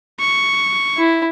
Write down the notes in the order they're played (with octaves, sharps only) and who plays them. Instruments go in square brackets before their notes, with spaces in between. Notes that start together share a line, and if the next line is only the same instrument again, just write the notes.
[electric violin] C#6
[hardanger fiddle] E4